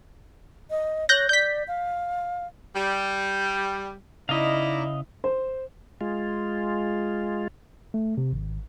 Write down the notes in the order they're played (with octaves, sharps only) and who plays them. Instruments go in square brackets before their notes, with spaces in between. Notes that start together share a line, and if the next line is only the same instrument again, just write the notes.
[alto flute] D#5
[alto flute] C#5 [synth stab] F#6 G6 A#6
[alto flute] D5 [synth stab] G6 B6
[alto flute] F5
[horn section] G3
[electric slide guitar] C#3 [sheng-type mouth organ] D#4 D5 A#5 [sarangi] E4 [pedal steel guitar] D#5 F5
[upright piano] C5
[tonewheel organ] G#3 F4
[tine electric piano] A3
C3
G#1